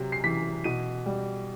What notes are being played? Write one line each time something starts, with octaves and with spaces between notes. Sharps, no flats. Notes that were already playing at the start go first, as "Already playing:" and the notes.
Already playing: C3 F#3
C7
E3 B6
B2 D#7
G3